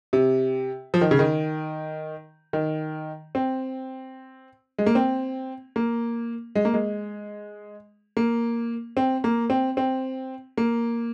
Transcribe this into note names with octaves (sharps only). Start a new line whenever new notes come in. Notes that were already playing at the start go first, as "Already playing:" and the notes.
C3
F3
D#3
C#3
D#3
D#3
C4
G#3
A#3
C4
A#3
G#3
A#3
G#3
A#3
C4
A#3
C4
C4
A#3